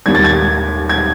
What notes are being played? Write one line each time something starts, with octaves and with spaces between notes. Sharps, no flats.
D#2 D#3 G3 G#6
A6
G#6
G#6